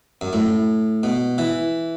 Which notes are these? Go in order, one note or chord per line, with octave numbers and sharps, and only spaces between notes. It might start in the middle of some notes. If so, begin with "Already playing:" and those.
F#2
A2
B2
E3